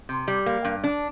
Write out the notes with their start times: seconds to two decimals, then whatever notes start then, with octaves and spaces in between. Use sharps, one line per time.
0.09 C3
0.28 G3
0.46 A#3
0.65 G2
0.84 D4